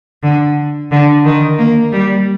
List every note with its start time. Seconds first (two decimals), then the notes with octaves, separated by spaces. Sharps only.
0.23 D3
0.91 D3
1.24 D#3
1.58 A#3
1.92 G3